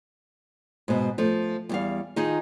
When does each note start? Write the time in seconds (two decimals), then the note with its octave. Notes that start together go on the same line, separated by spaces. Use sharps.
0.88 G#2 B2
1.18 F3 A3
1.69 E2 G3 F5
2.16 D#3 D#4 F4 G#4